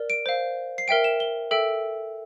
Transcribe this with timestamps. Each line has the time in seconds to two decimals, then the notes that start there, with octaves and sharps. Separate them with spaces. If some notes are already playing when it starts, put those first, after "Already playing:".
Already playing: A#4 D5
0.10 D7
0.26 C5 F5
0.78 C7
0.88 A#4 E5 G5 D7
1.04 E7
1.20 G7
1.51 A4 E5 G5 D7